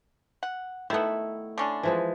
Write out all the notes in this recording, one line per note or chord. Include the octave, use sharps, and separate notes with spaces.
F#5
D#3 A3 B3 E4
D3 C#4 D4
E3 F3 G#3